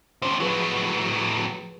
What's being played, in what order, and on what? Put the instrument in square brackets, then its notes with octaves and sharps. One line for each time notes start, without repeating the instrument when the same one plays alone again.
[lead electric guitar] D#2 F3 [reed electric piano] C#4 C5
[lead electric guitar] A2 F#3 [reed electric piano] F3 G#4 B4